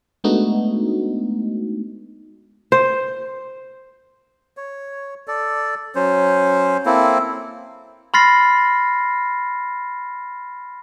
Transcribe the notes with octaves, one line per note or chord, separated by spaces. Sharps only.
G#3 A3 B3 D4 D#4 F#4
C5
C#5
A4 D5
F#3 C#4 C5
A#3 C4 E4 A4
B5 C6 F6 A6 A#6 C7